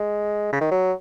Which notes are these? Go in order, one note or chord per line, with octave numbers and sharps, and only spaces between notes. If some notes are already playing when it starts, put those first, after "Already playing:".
Already playing: G#3
C#3
D#3
F#3